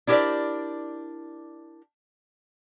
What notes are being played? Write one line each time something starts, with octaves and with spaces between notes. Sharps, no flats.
D4 E4 G4 A#4 C5 D5